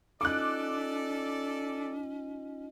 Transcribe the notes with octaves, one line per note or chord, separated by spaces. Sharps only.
C#4 D#4 F4 A4 D5 D#5 D6 F#6